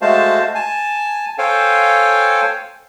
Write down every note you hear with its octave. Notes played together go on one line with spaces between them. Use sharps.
G#3 A3 F#4 C5 F5 A5
G#5 A5
A4 C5 C#5 F5 G5 G#5